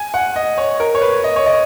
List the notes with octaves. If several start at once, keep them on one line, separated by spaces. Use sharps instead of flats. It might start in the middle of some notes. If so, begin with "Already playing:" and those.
Already playing: G#5
F#5
D#5
C#5
A#4
C#5
B4
D#5
C#5
D#5